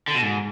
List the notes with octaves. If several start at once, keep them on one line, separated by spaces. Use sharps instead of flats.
D3
B2
G#2